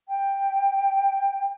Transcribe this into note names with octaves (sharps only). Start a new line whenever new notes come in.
G5